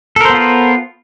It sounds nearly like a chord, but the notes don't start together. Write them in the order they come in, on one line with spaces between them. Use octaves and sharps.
A4 A#4 C5 B3 F4